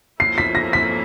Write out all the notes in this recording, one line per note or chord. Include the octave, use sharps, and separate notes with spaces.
F3 A#3 C#4 E4 C7
B6
A#6
B6